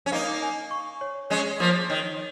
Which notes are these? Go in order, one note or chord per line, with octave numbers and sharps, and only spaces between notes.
C#4
A#3 D#4 F5
G#5
C#6
C#5
G#3 C#4 C#5
F3 A#3
D#3 C#5